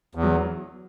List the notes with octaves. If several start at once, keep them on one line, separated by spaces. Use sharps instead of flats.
E2
F#3